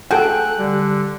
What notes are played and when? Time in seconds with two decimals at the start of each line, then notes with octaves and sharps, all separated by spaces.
0.11 F#4 G#4 A4 G5 F#6
0.58 D3 G3